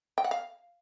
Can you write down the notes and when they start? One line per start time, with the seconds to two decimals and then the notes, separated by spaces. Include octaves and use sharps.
0.18 G5
0.24 F#5
0.31 F5